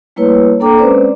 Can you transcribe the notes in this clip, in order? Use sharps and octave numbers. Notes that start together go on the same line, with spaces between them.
G3 A3 A#3 E4 B4 C#5
A#3 D4 A4 G5 A#5 D6
G#3 C4 C#4 B4 C5 D5